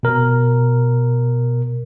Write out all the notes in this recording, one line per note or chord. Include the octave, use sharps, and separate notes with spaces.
B2 A#4